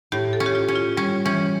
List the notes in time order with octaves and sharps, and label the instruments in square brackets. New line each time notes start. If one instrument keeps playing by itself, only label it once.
[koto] A2 [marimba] G4
[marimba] A4
[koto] C#4
[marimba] G4
F4
[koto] C#4
[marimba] F4
[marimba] G3 [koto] C#4
[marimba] E3 [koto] C#4